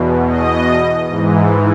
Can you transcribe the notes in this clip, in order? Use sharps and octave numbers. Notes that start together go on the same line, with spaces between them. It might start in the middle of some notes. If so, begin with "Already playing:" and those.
Already playing: E2 B2
D#5
G#2 E3